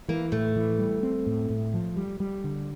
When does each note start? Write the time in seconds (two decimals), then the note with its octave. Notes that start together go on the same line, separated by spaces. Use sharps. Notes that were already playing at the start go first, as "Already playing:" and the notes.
0.09 E3 A#3
0.32 A2 A3
0.56 E3
0.79 G3
1.03 C4
1.27 A2
1.50 A2
1.74 F3
1.96 G3
2.20 G3
2.44 D3